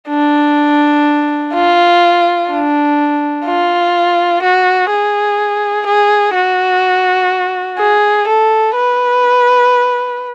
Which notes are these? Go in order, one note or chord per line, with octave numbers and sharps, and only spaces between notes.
D4
F4
D4
F4
F#4
G#4
G#4
F#4
G#4
A4
B4